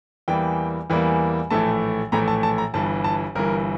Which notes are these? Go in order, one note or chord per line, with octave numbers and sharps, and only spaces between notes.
E2 E3 G3 A#3 G5
E2 E3 G3 A#3
A#1 A2 E3 A3 A5
A#1 A2 E3 A3 A#5
A5
A5
A#5
G1 G2 E3 A5
A5
G1 G2 E3 A#4